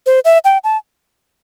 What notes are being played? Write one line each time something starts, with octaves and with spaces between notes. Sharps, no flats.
C5
E5
G5
A5